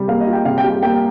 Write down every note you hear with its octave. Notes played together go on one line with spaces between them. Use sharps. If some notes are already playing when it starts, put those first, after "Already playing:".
Already playing: C3 G3
A#3 F5
D#5
F4
G5
C3 F5
G5
G3
G5
A#3 G5